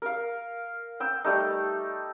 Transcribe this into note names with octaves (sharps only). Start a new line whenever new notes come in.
A#4 F5
G5 E6
G3 A3 D#4